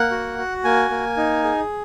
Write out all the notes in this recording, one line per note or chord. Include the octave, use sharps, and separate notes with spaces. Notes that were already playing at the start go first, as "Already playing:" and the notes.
Already playing: A#3 F#5
F#4
F#4
A#3 G#5
A#3
D#4
G#4